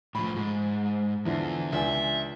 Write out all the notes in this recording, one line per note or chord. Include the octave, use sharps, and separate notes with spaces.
A2 F3 B5
G#2
E2 D3 E3 F3
C#2 D4 E5 G#5